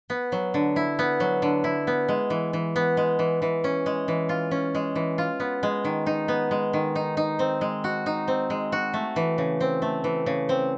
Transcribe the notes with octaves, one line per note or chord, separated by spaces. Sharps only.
B3
F#3
D3
E4
B3
F#3
D3
E4
B3
G#3
E3
E3
B3
G#3
E3
E3
C#4
G#3
E3
F4
C#4
G#3
E3
F4
B3
G#3
D#3
D#4
B3
G#3
D#3
D#4
D#4
C4
G#3
F#4
D#4
C4
G#3
F#4
A3
E3
C#3
C4
A3
E3
C#3
C4